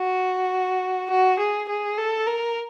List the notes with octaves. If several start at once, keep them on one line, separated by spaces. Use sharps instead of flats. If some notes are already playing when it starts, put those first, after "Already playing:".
Already playing: F#4
F#4
G#4
G#4
A4
A#4